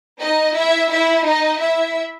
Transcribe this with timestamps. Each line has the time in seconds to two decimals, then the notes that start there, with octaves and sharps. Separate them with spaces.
0.20 D#4 D#5
0.55 E4 E5
0.90 E4 E5
1.25 D#4 D#5
1.59 E4 E5